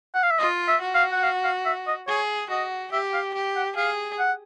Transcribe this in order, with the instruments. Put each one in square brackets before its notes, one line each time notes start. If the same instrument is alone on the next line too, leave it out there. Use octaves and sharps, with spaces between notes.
[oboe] F#5
F5
E5
[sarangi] F4 [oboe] D#5
[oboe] E5
[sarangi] F#4
[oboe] F5
F#5
F5
F5
E5
D#5
[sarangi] G#4 [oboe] C#5
[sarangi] F#4 [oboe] D#5
[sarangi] G4 [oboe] E5
[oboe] F5
[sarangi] G4
[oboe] F#5
[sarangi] G#4 [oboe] F5
[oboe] F#5